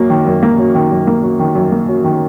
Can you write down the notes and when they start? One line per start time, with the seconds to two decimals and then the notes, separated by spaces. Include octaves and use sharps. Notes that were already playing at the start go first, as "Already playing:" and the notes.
Already playing: F#2 F#3 A#3
0.10 D#3
0.26 F#2
0.43 A#3
0.59 F#3
0.75 D#3
0.92 F#2
1.07 A#3
1.23 F#3
1.39 D#3
1.55 F#2
1.72 A#3
1.88 F#3
2.04 D#3